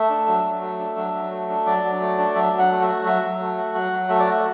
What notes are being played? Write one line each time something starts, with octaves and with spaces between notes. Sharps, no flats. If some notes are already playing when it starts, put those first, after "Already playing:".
Already playing: A3 E5
D4
F#3
F#3
A3
D4
F#3
F#3
A3
D4
F#3 D5
F#3
A3
D4
F#3 E5
F#3
F#5
A3
E5
F#4
F#3 E5
F#3
A3
F#4
F#3 F#5
F#3
A3 E5
D5
F#4 E5